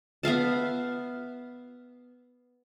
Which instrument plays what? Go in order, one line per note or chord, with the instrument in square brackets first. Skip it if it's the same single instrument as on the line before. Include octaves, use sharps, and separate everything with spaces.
[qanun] B3 E5 F5 A5